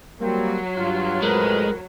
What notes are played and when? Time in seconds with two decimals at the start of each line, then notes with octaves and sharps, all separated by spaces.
0.20 F#3 G3 A#3 C4
0.76 G2 F4
1.22 F2 A2 G#3 A#4 B4